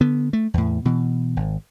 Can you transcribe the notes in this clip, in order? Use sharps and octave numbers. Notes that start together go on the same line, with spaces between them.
D3 B3
A3
E2 A2
B2 E3
G#1